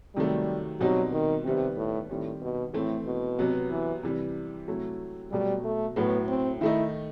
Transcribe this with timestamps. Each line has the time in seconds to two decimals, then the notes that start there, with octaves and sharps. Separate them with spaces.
0.15 C3 D#3 F#3 G3 A3
0.80 B2 F#3 G3 C4 D#4
1.13 D#3
1.45 C3 D#3 G3 B3
1.77 A2
2.09 A2 D#3 G3 C4
2.42 B2
2.74 A2 E3 A3 C4
3.06 B2
3.39 C3 F#3 B3
3.70 E3
4.03 C3 E3 G3
4.67 C3 F#3 A3 E4
5.32 B2 F#3 G3 A3
5.64 A3
5.96 A2 F#3 A3 B3
6.29 C4
6.61 D#3 A3 D#4 E4